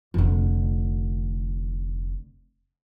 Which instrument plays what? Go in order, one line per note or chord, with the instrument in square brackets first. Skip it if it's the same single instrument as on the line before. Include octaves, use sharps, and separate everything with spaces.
[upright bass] F1 D3